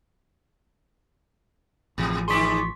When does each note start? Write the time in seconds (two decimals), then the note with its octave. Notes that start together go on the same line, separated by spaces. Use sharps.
1.98 A1 B2 F3
2.28 D#3 D4 G#4 C6 C#6 B6